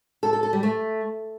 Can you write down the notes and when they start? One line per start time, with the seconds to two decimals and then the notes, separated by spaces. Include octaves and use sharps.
0.23 A4
0.33 A4
0.43 A4
0.53 G3
0.63 A3